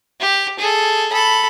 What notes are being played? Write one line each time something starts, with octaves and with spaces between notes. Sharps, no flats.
G4
G#4 A4
A4 B5